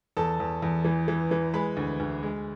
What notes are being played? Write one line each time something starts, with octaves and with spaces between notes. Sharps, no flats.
E2 A4 A5
E2
E2
E3
E3
E3
G#3 B4 B5
D2
D2
G#3